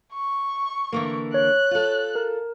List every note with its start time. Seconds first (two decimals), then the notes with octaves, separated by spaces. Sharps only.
0.13 C#6
0.92 D3 E3 A#3
1.34 C#5 F#6
1.71 F4 A4
2.15 A#4